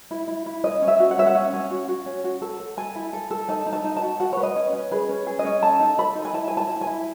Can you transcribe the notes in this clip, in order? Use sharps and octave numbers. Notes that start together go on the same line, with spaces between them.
E4
E4
E4
C#4 D#5
C#4
E5
F#4
F#5
C#4 E5
F#5
C#4
C#4
F#4
F#4
C#4
F#4
A4
A4
A4 G#5
E4
A4
A4
D#4 A5
D#4
A5
D#4
A5
F#4
F#4 F#5
B4 C#5
D#5
C#4
C#4
G#4 B4
C#4
G#4
D#5
C#4
A4 A5
D#4
A4 B5
D#4
G#5
E4 A5
E4 G#5
A5
E4
G#5
E4